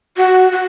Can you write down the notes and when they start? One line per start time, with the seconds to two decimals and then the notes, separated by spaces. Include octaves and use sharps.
0.17 F#4
0.52 F#4